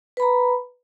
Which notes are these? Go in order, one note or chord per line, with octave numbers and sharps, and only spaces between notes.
B4 A#5 B5